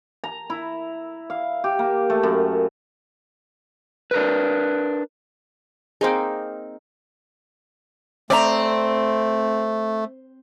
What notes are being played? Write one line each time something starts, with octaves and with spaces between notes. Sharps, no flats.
A#5
E4
F5
G4
A#3
A3
F#2
D4 A#4 B4
A#3 C4 D#4 G#4 C5 G5
A3 C4 D5 E5 A#5